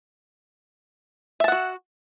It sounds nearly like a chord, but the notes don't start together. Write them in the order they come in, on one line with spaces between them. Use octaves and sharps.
E5 A5 F#5 F#4